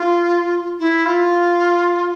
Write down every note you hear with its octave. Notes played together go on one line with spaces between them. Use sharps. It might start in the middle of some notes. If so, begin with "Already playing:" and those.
Already playing: F4
E4
F4